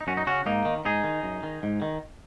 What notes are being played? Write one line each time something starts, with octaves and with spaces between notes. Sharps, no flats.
D#4
F#2 C#4 F#4
D#4
C#3 C#4 F#4
G#2 A#3 D#4
D#3
G#2 D#4 G#4
D#3
F#2
D#3
G#2
D#3